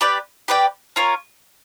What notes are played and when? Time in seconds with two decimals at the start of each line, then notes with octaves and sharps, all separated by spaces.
0.01 G4 B4 D5 G5
0.48 G4 B4 D5 G5
0.96 C#4 F4 A#4 C#5